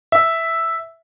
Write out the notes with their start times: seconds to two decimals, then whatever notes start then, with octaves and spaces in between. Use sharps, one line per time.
0.12 E5